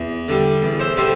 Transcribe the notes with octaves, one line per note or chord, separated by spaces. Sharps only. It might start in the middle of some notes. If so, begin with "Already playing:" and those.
Already playing: E2
D3 G3
E2
C5 E5
D3 G3 C5 E5